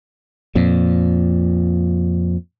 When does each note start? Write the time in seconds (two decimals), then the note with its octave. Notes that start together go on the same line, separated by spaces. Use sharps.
0.55 F2 A#2